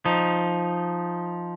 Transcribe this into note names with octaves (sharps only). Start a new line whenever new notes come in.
F3 D#4